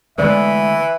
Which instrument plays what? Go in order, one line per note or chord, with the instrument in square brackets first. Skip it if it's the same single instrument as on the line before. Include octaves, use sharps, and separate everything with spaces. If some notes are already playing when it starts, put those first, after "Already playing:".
[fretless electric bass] D3 G#3 A3 [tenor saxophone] E3 [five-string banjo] B3 D5 [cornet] E5